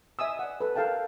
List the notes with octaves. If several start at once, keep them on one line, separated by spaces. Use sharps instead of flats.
D#5 E5 G#5 D#6 E6
D5 F#5
A4 B4
A4 A#4 F5 G5 A5